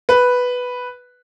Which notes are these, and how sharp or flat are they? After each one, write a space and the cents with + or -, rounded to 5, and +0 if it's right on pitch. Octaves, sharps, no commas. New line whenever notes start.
B4 +0